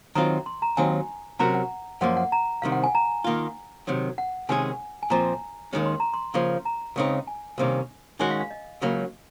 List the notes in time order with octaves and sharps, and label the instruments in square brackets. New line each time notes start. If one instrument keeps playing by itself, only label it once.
[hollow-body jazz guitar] D#3 F#3 C4 F4 [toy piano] A#5
[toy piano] C6
A#5
[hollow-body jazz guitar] D#2 D#3 F#3 C4 D#4 [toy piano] G#5
[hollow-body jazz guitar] C3 F#3 C#4 F#4 A#4 [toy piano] A#5
[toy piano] F#5
[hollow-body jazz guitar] F#2 F3 A#3 [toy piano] F#5
[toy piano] F#5
A#5
[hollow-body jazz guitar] C2 C3 D#3 [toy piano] F5
[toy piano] F#5
G#5
A#5
[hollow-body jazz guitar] D#3 A#3 F4
C3 D#3 F#3
[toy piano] F#5
[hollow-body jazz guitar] C3 D#3 G#3 C#4 G#4 [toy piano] G#5
[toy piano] G#5
[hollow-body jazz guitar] A#2 F3 C4 [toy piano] A#5
[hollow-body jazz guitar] D#2 D#3 G#3 C#4
[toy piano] C6
A#5
C6
[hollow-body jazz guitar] C#3 F3 A#3
[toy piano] A#5
[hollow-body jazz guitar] C#2 C#3 G#3 C4 D#4
[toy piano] G#5
[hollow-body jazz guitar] C2 C3 D#3 A#3 C#4
[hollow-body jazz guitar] D#3 G#3 C#4 F#4 [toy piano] G#5
[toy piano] F5
F5
D#5
[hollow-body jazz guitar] C#2 C#3 F#3 A#3